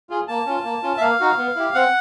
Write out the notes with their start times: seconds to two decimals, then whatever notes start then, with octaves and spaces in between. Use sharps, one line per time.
0.10 F4 G#4
0.28 A#3 A5
0.46 C#4 F4
0.65 A#3
0.83 C#4 F4
0.97 E5
1.01 A#3 F5
1.20 D#4 F#4
1.37 B3
1.56 E4 G4
1.74 C4 F#5